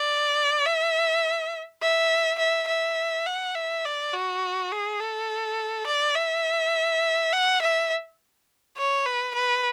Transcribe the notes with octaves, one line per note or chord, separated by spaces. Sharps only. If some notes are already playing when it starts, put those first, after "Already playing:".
Already playing: D5
E5
E5
E5
E5
F#5
E5
D5
F#4
G#4
A4
D5
E5
F#5
E5
C#5
B4
B4